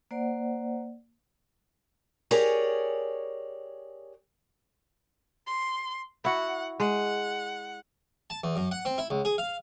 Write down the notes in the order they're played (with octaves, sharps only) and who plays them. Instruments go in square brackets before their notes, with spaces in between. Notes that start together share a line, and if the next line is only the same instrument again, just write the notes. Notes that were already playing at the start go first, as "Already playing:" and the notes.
[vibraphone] A#3 C5 D5 F#5
[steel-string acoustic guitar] G4 G#4 A#4 C#5 D5 G#5
[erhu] C6
[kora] E4 F#4 [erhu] F#5
[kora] G#3 [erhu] F#5
[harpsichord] A5
E2
F#2
F#5
C4
E4
C#2
G#4
F5